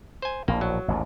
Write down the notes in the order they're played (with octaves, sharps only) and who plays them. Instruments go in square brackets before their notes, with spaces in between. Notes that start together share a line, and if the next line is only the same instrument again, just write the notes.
[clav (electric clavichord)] C5 G#5
[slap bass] A#1 A2 [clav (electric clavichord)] A#3
[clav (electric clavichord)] F#3
[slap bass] A1 D#2 G#2